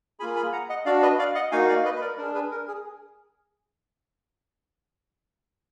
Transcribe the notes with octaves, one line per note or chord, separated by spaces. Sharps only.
A#3 F4 G#4 G#5 B5
G#5 B5
F#5 A#5
D#5 F#5
D4 F#4 D5 F5
B4 D#5
D5 F5
D#5 F#5
A#3 D#4 F#4 F5 G#5
D5 F5
B4 D#5
B4
A#4 D5
D4 G#4 A#4
G#4 B4
A#4
G#4